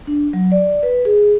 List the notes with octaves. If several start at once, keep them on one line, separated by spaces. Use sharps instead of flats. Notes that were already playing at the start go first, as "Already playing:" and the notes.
D4
F#3
D5
B4
G#4